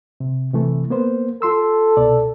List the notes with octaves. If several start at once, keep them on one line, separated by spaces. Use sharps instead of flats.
C3
C3 E3 A3
A#3 B3 C5
F4 A4 C6 E6
C2 B2 D5